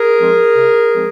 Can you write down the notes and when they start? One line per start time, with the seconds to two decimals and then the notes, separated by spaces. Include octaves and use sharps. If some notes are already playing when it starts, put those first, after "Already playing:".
Already playing: G#4 A#4
0.19 F3 G#3 C4
0.56 C3
0.93 F3 G#3 C4